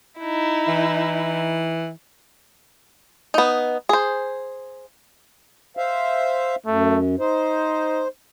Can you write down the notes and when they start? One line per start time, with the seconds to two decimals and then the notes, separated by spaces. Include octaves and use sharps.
0.20 D#4 E4
0.68 E3
3.34 B3 D#4
3.89 G#4 C5
5.77 C5 E5 F5
6.66 F#2 A3
7.19 D#4 C5